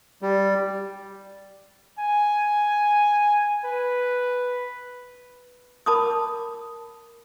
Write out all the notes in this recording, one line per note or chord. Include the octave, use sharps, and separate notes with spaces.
G3
G#5
B4
A#4 A5 B5 D6 D#6